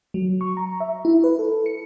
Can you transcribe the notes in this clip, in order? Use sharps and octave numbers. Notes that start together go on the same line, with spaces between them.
F#3
C#6
A#5
E5
E4
B4
A4
C#7